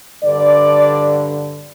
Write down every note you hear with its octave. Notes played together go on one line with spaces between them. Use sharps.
G2 D3 D5